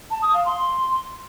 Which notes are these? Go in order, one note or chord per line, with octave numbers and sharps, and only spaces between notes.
A5
D#6
F5
C6